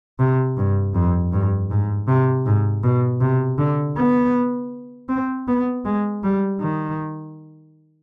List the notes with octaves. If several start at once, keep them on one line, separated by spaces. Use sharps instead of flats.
C3
G2
F2
G2
G#2
C3
G#2
B2
C3
D3
B3
C4
B3
G#3
G3
D#3